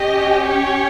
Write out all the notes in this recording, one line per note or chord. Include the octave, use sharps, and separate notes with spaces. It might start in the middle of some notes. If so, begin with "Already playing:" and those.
Already playing: C#4 G4 D#5
C#5